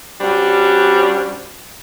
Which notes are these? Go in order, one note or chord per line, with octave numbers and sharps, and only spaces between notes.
G3 C#4 D4 F#4 C5